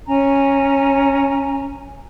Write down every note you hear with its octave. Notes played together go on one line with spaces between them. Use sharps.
C#4 G#5 A#5